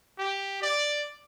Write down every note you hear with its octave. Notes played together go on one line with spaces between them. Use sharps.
G4
D5